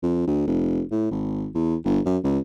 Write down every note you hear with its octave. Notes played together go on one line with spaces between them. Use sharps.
F2
D2
F1
A2
G#1
E2
G1
F#2
C#2